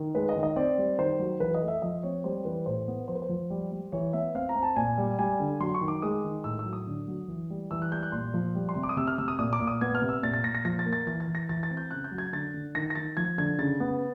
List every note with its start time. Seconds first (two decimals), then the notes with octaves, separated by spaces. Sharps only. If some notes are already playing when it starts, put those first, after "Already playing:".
Already playing: D#3
0.14 G#3 B4
0.29 D#5
0.36 D#3
0.43 D#5
0.56 C4 D5
0.78 G3
0.99 D#3 C5
1.19 F#3
1.40 E3 B4
1.54 D#5
1.62 A3
1.68 E5
1.82 F3 D#5
2.03 C4 C#5
2.24 G3 C5
2.45 E3 B4
2.66 A2 C5
2.88 B3
3.08 F3 C5
3.15 B4
3.22 C5
3.29 F3
3.50 G3
3.71 G3
3.92 E3 C#5
4.13 B3 E5
4.35 C4 F5
4.49 A#5
4.56 C4
4.63 A5
4.76 A#2 G#5
4.98 G3
5.19 G3 G#5
5.40 D3
5.60 F#3 C6
5.74 C#6
5.81 D#3
5.88 D6
6.02 G#3 D#6
6.24 D#3
6.44 A2 E6
6.59 E6
6.65 F#3
6.73 D#6
6.87 D3
7.08 F#3
7.28 E3
7.50 G3
7.71 E3 E6
7.82 F#6
7.92 G3 G6
8.03 F#6
8.12 A#2 C6
8.34 F3
8.55 G3
8.69 C6
8.76 C3
8.83 D6
8.89 D#6
8.97 C3 E6
9.07 F6
9.18 C3 E6
9.28 D#6
9.39 A#2 D#6
9.53 D6
9.60 A#2
9.67 D#6
9.81 B3 G#6
9.95 F6
10.02 C3
10.09 E6
10.23 A#2 A6
10.34 A6
10.44 A#2 A#6
10.55 A#6
10.65 F3 A#6
10.79 A6
10.85 A#3
10.93 A6
11.06 E3 A6
11.20 A6
11.28 E3
11.35 A#6
11.49 E3 A6
11.63 A6
11.71 C4
11.77 G6
11.91 C#3 F#6
12.04 G6
12.12 F#3
12.18 G#6
12.32 D3 A6
12.54 D3
12.75 D#3 A#6
12.90 A#6
12.95 D#3 A6
13.17 F3 G#6
13.38 D3 G#6
13.59 C#3 A6
13.80 B3